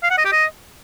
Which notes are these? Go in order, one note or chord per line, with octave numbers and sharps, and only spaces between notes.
F5
F#5
D#5
G4
D#5